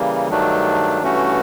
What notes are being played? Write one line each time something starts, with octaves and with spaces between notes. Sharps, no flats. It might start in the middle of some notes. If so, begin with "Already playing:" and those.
Already playing: C#3 E3 G3 A#3
G2 D#3 F#3 A3 D4
G2 E3 A3 C#4 F#4